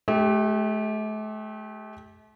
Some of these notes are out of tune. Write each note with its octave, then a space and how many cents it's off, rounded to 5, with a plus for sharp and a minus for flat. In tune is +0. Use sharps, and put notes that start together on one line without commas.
A3 -40 G4 +0